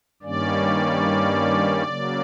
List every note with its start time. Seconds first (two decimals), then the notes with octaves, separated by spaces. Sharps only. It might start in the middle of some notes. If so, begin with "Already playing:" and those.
0.22 G2 D#3 G3 A#3 C#4 D5
1.83 C#3 F#3 A#3